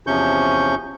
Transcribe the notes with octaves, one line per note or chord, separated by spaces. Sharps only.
E2 C3 F3 C#4 C#6 G6